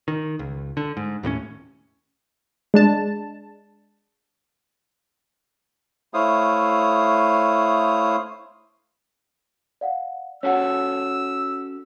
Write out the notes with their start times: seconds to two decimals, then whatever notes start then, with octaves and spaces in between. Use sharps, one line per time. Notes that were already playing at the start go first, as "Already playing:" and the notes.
0.08 D#3
0.39 C#2
0.77 D3
0.97 G#2
1.23 D#2 A2 A#3 C#4
2.74 G#3 D4 A5
6.14 A3 E4 C5 C#5 F5 D#6
9.81 D5 F5 F#5
10.43 C#4 F#4 A4 C#5 F#5 E6